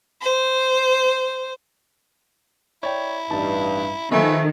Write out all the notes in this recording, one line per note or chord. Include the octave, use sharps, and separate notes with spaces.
C5
E4 C#5 D5 G5
A1 G2 D#4 A5
D#3 F3 A3 B4 D#5 G#5 A#5